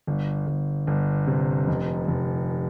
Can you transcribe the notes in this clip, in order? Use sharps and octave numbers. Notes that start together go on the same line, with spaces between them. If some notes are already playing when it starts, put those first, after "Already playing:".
G1
G1
G1
C3
F1
F1